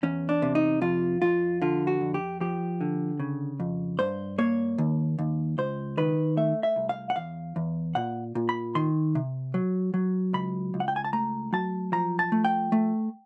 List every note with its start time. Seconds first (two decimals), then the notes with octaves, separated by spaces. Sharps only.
0.03 E2 C#4
0.29 D4
0.42 C3
0.55 D#4
0.81 F2 F4
1.22 F2 F4
1.62 D3 F4
1.87 F#4
2.01 F2
2.14 G4
2.40 F3 G4
2.81 D3
3.20 C#3
3.60 F2
3.99 G2 C5
4.38 A#3 C#5
4.78 D#2
5.19 D#2
5.58 C#2 C5
5.97 D#3 B4
6.37 A3 E5
6.63 E5
6.76 C2
6.89 F5
7.10 F#5
7.16 E2 F5
7.56 E2
7.95 A#2 F#5
8.35 A#2
8.49 B5
8.75 D#3 C6
9.15 C3
9.54 F#3
9.94 F#3
10.33 C#2 B5
10.74 C#2
10.80 F#5
10.88 G5
10.96 G#5
11.04 A5
11.13 A3 A#5
11.53 F#3 A5
11.92 F3 A#5
12.19 A5
12.32 A3
12.45 G5
12.72 A3